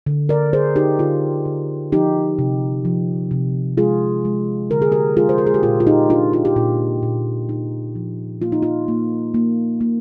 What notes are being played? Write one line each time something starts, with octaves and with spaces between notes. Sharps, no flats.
D3
A#4 D5
D3 G#4 C5
D#4 G4
D3 F4
D3
F3 D#4 G4
C3
F3
C3
G#3 F4 G#4
G#3
D3 A#4
G#4
G4 A#4
G#3 F4 G#4
C5
A#4
G#4
G4
A#2 F4
F4
D#4 G4
D4 F4
F4
G4
A#2 F4
A#2
D#4
F3
A#3 F4
D#4
F4
A#3
A#3
A#3